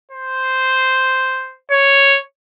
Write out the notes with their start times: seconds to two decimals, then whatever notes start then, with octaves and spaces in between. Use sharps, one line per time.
0.11 C5
1.71 C#5